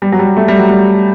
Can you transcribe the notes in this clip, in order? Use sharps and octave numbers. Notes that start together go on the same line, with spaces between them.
G3
F#3
G3
A3
G3
F#3
G3